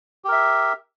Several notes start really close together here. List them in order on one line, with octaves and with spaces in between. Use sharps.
G4 A#4 E5